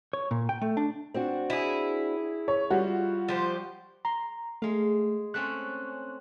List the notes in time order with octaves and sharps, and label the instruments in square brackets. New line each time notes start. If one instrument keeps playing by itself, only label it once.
[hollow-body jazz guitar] C#5
A#2
G5
A3
D4
[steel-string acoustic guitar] C4 D4 F#4
[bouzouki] E4 G#4
[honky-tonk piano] C#5
[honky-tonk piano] G3 F#4 [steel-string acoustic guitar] F4
[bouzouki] F3 G4 C5
[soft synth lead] A#5 [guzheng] C6
[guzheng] G#3 F5 [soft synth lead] A3
[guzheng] A3 C4 C#4 [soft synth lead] F#6